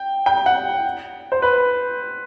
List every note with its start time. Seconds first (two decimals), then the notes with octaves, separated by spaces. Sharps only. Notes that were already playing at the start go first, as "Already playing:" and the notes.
Already playing: G5
0.26 G5
0.46 F#5
1.32 C5
1.42 B4